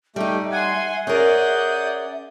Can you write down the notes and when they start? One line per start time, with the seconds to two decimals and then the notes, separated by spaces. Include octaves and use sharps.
0.16 G3 A3 D#4 G4 E5
0.51 F#5 G#5 C6
1.07 C#4 G#4 A#4 D5 F#5 D#6 G6